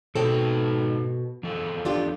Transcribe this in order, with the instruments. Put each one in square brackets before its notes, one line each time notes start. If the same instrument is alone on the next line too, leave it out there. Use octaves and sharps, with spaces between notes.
[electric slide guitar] G#2 D#4 G5 [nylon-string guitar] B2 C4 A4
[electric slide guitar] E2 F3 A4
[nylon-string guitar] D4 F4 G4